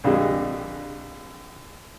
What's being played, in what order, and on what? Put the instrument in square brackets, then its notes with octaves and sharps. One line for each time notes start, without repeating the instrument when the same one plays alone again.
[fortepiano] A#1 F2 D3 G3 G#3